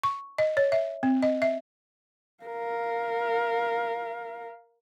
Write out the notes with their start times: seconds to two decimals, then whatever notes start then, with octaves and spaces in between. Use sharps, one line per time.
0.03 C#6
0.38 D#5
0.57 C#5
0.72 E5
1.03 C4
1.23 D#5
1.42 E5
2.44 A#4 F5